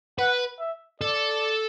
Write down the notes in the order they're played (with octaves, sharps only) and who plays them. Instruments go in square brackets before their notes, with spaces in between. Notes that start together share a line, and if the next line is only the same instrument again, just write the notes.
[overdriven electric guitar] B4 [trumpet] F#5
[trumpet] E5
[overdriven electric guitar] A4 [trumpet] D5